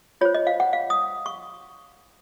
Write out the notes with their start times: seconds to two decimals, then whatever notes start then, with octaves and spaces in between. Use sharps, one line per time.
0.21 F4 C5 C#5
0.34 D#5
0.47 F5
0.60 F#5
0.73 F5
0.90 D#6
1.26 C#6